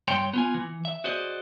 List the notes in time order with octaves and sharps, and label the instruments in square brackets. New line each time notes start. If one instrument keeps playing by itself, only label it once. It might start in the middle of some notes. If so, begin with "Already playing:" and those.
[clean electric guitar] G2 C#5 G5 C6
B3 F4 G#5
E3
E5
F#4 G#4 C5 D5 D#5